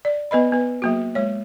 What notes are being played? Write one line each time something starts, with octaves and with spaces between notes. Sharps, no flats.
D5
B3 B4 D#5 B5
B3 B4
F#3 A#3 F#4
G#3 C#5